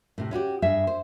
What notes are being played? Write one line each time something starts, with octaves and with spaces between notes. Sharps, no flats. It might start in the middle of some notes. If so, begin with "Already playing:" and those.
A2 C3
C#4 E4 F#4 G4
G2 G#4 E5
C5